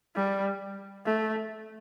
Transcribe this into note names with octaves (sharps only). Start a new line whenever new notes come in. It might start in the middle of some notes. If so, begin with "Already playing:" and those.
G3
A3